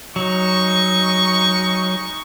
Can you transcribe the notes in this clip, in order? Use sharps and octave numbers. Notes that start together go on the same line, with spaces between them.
F#3 G#3 D#4 C#6